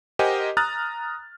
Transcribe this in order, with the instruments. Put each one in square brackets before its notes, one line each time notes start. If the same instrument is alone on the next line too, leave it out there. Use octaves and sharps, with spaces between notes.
[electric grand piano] G4 A#4 C5 D#5 F#5 G#5
A#5 D#6 F6 F#6 A6